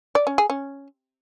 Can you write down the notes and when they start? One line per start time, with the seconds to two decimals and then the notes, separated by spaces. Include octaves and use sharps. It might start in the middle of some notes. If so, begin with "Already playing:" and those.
0.15 D5
0.27 C#4
0.38 G#4
0.50 C#4